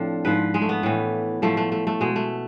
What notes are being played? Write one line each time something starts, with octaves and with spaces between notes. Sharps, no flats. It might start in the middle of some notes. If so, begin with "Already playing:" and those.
Already playing: A2 F3 C4 D4
G#2 F3 B4
G#3
A3
B3
A2 E3
A2 F3 A3
A3
A3
A3
B2 G#3
A3